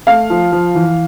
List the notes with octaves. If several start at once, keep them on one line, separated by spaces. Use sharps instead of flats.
A3 F5
F3
F3
E3